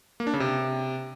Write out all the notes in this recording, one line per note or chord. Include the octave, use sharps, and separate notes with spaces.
A#3
D4
C#3
C3